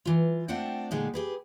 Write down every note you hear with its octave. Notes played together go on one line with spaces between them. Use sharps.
E3 F4
A3 C4 D4 F4 F#5 G5
A#2 D3 G#3 A3 D#4 G4
G4 G#4 B4